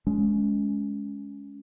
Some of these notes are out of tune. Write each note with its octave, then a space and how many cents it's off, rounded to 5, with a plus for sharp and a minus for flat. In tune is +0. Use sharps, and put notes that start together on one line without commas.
G#3 +5 C#4 +20